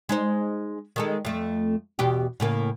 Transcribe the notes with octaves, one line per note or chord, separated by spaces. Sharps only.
G#3 D#4 C5
D#3 G#3 A4
F2 A3
E2 B2 G4
A2 C#3 A#3